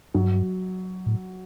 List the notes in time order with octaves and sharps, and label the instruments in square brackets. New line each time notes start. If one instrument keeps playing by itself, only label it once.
[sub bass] G2 [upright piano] F#3
[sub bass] A2